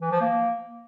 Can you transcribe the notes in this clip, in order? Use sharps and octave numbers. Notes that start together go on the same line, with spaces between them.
E3
F3
A#3